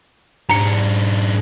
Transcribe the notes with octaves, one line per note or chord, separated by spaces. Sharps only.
G#2 D4 A#5 C#7